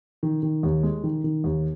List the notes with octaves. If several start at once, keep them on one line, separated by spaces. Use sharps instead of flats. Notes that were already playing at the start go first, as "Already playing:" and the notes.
D#3
D#3
D#2
G#3
D#3
D#3
D#2